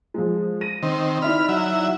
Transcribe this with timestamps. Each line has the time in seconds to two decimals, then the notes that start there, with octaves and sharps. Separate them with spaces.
0.14 F3 G#3
0.61 A#6 D#7
0.83 D#3 C4
1.22 D#4 E4 D5 B5 F6
1.49 F#3 E5